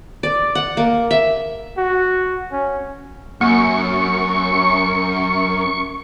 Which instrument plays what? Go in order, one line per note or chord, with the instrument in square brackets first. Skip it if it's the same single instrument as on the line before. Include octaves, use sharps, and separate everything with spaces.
[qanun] D5
F#5
A#3
E5
[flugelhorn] F#4
C#4
[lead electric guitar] F#2 [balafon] A#3 [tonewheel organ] C#6